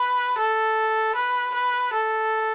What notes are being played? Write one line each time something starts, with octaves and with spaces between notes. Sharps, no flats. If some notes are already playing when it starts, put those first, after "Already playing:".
Already playing: B4
A4
B4
B4
A4